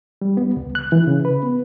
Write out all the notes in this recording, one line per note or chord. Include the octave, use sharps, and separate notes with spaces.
G3
B3
C#2
F#6
E3
C#3
B4
B3